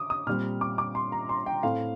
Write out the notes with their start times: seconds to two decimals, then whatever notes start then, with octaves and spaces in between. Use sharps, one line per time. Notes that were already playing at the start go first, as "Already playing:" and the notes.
Already playing: D6 D#6
0.10 D#6
0.27 A#2 G3 C4 F6
0.61 D6
0.78 D6
0.95 C6
1.12 A#5
1.29 C6
1.46 G5
1.63 A2 A3 C4 F5